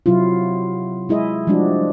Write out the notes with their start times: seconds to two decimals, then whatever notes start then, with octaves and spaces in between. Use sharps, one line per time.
0.06 C3 F#3 E4 F4
1.09 G#3 E4 G#4 D#5
1.47 F3 G3 G#3 D4 F#4